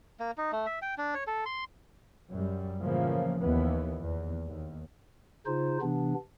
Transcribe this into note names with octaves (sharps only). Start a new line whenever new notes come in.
A#3
D#4
A3
E5
G5
D4
C#5
A4
C6
F#2 G3
A2 C#3 E3 F3 A#3
D#2 E3 B3
E2
D#2
C#3 D#4 F4 C5
C3 E3 B3 D4